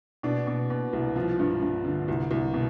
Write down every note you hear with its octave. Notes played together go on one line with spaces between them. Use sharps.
B2 D4
B2
B2
C2
F3
G2
G2
D3
C2
C2
B2